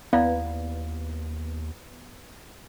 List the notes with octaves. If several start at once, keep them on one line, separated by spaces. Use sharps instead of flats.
D#2 B3 E4 D5 F5